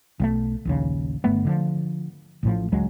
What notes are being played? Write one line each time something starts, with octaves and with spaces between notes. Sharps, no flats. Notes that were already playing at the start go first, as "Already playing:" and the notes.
B1 G3 A3
A#1 D#2 C#3
G1 A3 B3
D3 D#3 F3
A1 A2 F3
D1 C#2 F#3 G#3